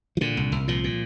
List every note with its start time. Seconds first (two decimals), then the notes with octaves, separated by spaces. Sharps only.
0.17 F3
0.21 A#2 D3
0.37 C2
0.52 C2
0.68 A#2 F3
0.84 A#2